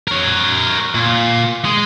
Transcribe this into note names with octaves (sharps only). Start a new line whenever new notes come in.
A#4 C#5
A#2
G#3